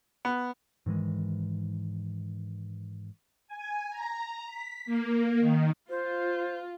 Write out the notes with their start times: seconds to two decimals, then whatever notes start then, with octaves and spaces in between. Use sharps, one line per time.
0.25 B3
0.86 G#2 D#3 E3 G#3
3.48 G#5
3.90 A#5
4.47 B6
4.86 A#3
5.39 D#3
5.90 F4 C5